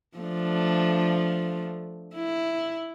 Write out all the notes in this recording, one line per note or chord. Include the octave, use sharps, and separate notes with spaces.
F3 A3 D4
E4